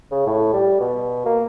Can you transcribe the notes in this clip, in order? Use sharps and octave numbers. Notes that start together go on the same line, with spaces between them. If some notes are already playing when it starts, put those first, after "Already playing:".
C#3
A2
G3
B2
A#3